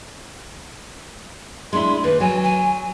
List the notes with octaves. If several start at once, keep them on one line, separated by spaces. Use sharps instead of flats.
G#3 D4 E4 C6
D#2 B4
F#3 G#5
G#5